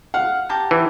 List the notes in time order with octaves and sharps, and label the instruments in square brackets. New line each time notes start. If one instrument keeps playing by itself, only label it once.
[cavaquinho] F5 [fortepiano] F#5
[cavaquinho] G4 A5 A#5
[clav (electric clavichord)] E3